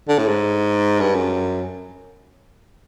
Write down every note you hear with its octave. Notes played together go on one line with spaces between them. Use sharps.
D3
A2
G#2
G2
F#2